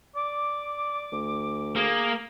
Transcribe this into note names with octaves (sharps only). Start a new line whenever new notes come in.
D5 D6
D2
A#3 G#4